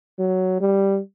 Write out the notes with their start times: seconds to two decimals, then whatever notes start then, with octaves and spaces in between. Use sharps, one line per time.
0.19 F#3
0.61 G3